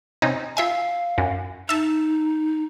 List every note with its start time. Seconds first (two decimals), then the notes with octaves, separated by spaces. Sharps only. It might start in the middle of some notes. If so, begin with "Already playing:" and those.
0.22 C3 C#4 D#4
0.57 F4 E5 F5 G#5
1.18 F#2
1.69 D#4 E5 A5